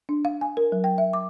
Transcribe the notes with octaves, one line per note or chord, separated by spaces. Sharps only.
D4
F5
G#5
A#4
F#3
G5
E5
D6